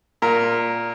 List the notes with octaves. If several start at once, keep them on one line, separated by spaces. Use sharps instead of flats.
A#2 A#4